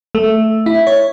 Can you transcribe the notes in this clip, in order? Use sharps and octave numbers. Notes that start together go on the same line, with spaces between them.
A3
E4
C#5